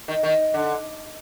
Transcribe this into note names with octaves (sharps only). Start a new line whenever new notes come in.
D#3
D#3
D3